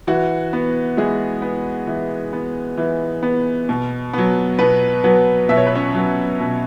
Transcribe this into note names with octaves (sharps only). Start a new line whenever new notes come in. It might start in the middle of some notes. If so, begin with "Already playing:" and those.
E3 F#4
B3
E3 G#3 G#4
B3
E3
B3
E3
B3
B2
F#3 B3
B2 B3 B4
F#3 B3 B4
B2 E5
C#5
B4
C#4 C#5
F#3 B3
B2